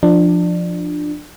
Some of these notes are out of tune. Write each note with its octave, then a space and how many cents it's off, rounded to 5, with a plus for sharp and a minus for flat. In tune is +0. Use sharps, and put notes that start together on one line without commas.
F3 +0 D4 +20